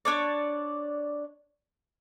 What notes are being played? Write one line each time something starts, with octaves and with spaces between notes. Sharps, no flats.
D4 C#5 D5